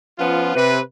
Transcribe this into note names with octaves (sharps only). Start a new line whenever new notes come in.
F3 B3 C#4 F4
C3 B4